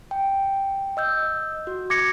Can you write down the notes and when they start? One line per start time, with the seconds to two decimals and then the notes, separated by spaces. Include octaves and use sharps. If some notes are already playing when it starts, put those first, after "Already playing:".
0.11 G5
0.97 D#5 E6 G6
1.67 F#4
1.90 D6 G#6 A#6 C#7